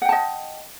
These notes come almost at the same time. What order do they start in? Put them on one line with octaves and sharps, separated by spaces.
F#5 G5 A5 D#5